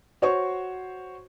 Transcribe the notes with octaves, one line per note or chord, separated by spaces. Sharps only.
F#4 C5 C#5 C#6